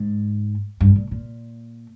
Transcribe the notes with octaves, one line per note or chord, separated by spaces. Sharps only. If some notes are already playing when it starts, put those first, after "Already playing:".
Already playing: G#2
G2
A#2
A#2